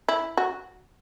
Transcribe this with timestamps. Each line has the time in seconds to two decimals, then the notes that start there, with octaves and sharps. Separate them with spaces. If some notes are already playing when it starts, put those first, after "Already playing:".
0.09 E4
0.37 F#4